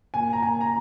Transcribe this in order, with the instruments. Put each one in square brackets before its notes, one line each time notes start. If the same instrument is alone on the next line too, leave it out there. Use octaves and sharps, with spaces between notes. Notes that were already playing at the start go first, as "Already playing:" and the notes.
[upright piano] A#2 G#5
A#5
A#2 G#5
A#5